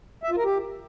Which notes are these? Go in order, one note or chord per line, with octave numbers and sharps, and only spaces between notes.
E5
F4
A#4
G4